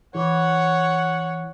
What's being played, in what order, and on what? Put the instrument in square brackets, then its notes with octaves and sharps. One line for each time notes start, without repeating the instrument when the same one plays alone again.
[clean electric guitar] E3 [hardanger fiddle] C#5 [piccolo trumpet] F#5